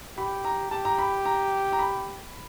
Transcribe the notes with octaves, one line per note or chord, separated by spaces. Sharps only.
G4 B5
A#5
G4 A5
A#5
B5
A#5
A#5
B5